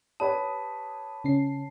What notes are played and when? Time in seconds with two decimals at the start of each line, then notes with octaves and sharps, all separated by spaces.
0.20 G4 B4 C#5 A5 D#6
1.24 C#3 C#4 C7